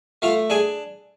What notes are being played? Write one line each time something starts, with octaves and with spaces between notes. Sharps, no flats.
A3 F4 F5
D4 G#4 G#5